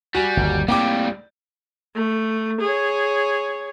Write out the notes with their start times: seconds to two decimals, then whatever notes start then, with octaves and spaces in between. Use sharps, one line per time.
0.15 G3 F#4 G#5
0.37 G1 D#2
0.68 A2 G3 A#3 C4 D5 G5 D6
1.95 A3
2.61 G#4 C#5